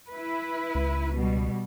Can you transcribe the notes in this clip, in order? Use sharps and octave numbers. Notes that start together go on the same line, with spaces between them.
E4 B4
C#2
B2 G3